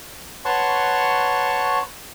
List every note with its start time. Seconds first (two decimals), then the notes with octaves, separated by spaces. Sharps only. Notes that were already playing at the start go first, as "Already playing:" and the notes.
0.45 B4 C#5 F#5 A5 C6 C#6